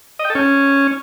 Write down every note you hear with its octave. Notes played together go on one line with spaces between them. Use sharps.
D#5
G5
A4
C#4